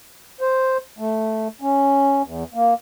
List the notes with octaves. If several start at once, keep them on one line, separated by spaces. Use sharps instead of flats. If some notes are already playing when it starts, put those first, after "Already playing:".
C5
A3
C#4
E2
A#3